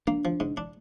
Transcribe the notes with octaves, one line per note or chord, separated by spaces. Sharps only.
A#3 D4
F3
G#2
D4